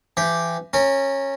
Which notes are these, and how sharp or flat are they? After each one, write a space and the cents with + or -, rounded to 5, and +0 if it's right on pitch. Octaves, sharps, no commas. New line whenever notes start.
E3 +25 G4 +0
C#4 -15 A#4 -35